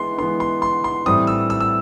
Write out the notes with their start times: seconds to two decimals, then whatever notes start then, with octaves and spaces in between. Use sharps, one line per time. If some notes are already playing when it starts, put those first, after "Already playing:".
Already playing: E3 G#3 B3 C6
0.18 E3 G#3 B3 C6
0.40 C6
0.62 C6
0.84 C6
1.06 A2 E3 G3 C4 D#6
1.27 E6
1.50 E6
1.60 E6